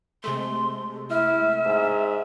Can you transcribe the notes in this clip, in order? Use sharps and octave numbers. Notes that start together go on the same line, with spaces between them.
C3 G#3 A3 C6
E4 E5 F6
G#2